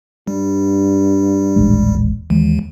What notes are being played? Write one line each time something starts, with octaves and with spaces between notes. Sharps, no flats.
G2 G3
D#1 A1 G#3
D#2 D#3 E3 G#3